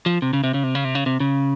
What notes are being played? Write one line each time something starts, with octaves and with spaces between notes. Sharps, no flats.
F3
C3
C#3
C3
C#3
C3
C#3
C3
C#3
C3
C#3